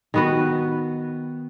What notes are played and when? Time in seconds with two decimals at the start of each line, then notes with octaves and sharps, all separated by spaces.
0.14 D#3 B3 F#4 B4